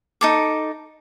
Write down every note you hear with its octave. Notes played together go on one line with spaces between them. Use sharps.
D#4 A4 D6